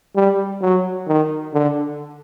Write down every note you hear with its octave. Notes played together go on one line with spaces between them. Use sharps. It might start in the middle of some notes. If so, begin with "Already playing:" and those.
G3
F#3
D#3
D3